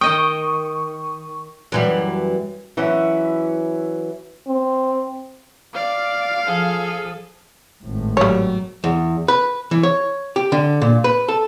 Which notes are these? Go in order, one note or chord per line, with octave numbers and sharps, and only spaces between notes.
D#3 D#5 G5 C#6 D#6
F#2 E3 G3
E3 F#3 C#4 E4
C4
D5 F5
F3 G#4 A4
G#1 A2
F#3 G3 C#5
E2
B4
E3
C#5
G4
D3
A#2
B4
A4